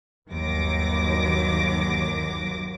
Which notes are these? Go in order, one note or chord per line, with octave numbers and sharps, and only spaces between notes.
G1 D#2 F#3 D6 A#6